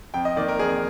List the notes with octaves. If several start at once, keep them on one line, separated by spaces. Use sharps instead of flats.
F2 G5
D#5
D#3 A#3 D5
A#4
F2 G#4